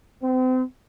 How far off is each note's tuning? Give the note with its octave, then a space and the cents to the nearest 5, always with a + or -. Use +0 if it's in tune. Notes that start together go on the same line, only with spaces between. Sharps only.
C4 -35